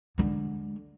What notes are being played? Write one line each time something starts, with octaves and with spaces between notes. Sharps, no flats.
D3 G#3